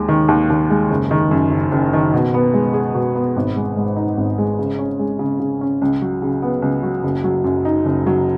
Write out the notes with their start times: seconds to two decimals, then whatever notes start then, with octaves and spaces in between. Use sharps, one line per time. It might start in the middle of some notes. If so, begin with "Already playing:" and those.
Already playing: D#2 G#3
0.09 D#3
0.28 D#2
0.50 D#2
0.70 G#3
0.90 F#1
1.11 D#3
1.31 F#2
1.51 F#1
1.72 F#1
1.93 D#3
2.14 B2
2.34 B3
2.53 G#3
2.74 G#4
2.95 B2
3.15 B3
3.36 G#1
3.56 G#3
3.77 G#2
3.96 D#4
4.18 G#1
4.38 G#3
4.59 C#3
4.79 C#4
4.99 G#3
5.19 C#3
5.40 C#3
5.61 C#4
5.82 C#2
6.02 F#3
6.22 C#3
6.42 B3
6.62 C#2
6.83 F#3
7.03 F#1
7.24 F#3
7.44 F#2
7.65 D#4
7.86 F#1
8.07 F#3